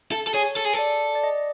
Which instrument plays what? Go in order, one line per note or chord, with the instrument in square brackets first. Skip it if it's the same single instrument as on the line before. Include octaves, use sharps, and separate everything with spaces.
[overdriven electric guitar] A4
A4
[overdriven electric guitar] G#4 [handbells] C#5
[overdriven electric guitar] A4
G#4
A4
[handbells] D5
D5
D#5